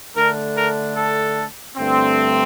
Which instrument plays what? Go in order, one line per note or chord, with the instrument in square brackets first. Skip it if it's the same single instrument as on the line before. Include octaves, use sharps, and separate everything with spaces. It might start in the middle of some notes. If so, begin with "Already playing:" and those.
[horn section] D3 A3 D4 A#4
A#4
A4
G2 D3 A3 C4